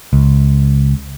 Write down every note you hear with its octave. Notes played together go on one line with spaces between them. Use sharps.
C#2